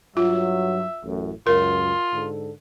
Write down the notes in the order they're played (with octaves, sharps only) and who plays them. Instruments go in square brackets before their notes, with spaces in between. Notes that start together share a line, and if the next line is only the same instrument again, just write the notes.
[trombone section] G2 F#3 [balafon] F4 [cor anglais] E5
[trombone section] A1 F#2 A2
[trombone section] C#2 F#2 [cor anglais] F4 [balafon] A#4
[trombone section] G#2 D3 A4